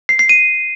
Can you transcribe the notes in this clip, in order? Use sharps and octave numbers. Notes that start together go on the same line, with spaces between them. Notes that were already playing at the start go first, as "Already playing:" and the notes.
C7
C7
D#7